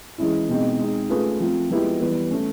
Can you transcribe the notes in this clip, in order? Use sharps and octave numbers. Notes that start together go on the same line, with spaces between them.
E3 G#3 C#4 E4
B2 G#3 C4 D#4
G#3 C4 D#4
A3 C#4 F4 G#4 B4
F3 A3 C4 F4
F3 G#3 B3 E4 G4
E3 G3 B3
E3 A3 C#4